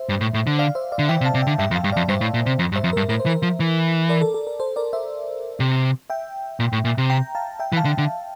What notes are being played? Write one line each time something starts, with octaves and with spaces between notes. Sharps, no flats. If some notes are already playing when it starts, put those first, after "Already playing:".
Already playing: C5 E5
G2
A2
A2
D3
D5 F5
C5 E5
D5 F5
D3
E3 E5 G5
C3
F5 A5
C3
D3 E5 G5
G2 E5 G5
F2
F5 A5
G2
F2 D5 F5
G2 C5 E5
A2
A#2
C3
F2
G2
C5 E5
F2
G2 A#4
A2 A#4
C5
E3
A#4
F3
E3
A#4 D5
A4
A4
A#4
A4 C5
A#4 D5
C5 E5
C3
E5 G5
A#2
A2
A#2
C3
G5 A#5
F5 A5
E5 G5
E3
F5 A5
D3
D3